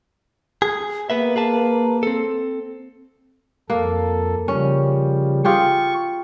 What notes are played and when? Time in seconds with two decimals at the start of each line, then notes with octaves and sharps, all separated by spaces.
0.62 G#4
1.10 A#3 B3 B4 E5
1.36 G#4 B4 A5
2.03 C4 A4
3.70 F2 A#3 A4
4.48 C#3 F3 G3 C#4
5.45 F4 G4 G#4 C#6